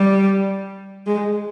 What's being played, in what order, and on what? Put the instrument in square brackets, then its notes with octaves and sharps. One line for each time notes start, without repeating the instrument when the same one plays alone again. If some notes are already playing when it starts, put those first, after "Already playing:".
Already playing: [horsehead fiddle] G3
G#3